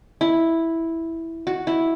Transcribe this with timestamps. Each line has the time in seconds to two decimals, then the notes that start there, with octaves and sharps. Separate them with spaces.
0.21 E4
1.47 F#4
1.67 E4